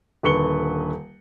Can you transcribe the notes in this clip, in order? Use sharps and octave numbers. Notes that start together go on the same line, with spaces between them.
D#1 D3 B4 C#6 C#7 G7